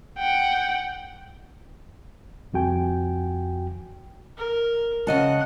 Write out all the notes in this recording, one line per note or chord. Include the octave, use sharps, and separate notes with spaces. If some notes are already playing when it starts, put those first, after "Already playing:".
F#5 G5
C2 F2 F#4 G5 G#5
A#4
C#3 D#5 F#5 A5